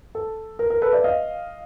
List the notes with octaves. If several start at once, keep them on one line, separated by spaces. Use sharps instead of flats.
A4
A#4
A#4
A4 B4
D5 E5
D#5 F5